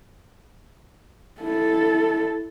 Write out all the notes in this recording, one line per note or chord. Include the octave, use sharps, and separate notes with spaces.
E4 A4